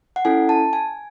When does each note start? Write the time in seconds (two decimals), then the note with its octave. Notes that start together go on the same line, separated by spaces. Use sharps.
0.16 F#5
0.25 C#4 E4 A4 G#5
0.49 A5
0.73 G#5